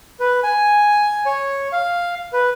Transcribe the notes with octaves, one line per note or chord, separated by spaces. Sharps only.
B4
G#5
C#5
F5
B4